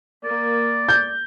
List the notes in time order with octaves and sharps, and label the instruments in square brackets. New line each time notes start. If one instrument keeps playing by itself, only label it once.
[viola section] A#3 [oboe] D5
[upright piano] G6